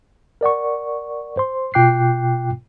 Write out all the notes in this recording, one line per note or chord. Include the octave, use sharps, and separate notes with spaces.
A#4 D5 F#5 C#6
C5 C6
B2 F4 G5 D6 F#6 C7